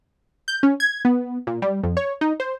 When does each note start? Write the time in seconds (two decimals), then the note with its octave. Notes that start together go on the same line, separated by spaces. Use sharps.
0.48 G6
0.63 C#4
0.80 G#6
1.05 B3
1.47 A#2
1.62 G3
1.83 F2
1.97 C#5
2.21 D#4
2.40 C5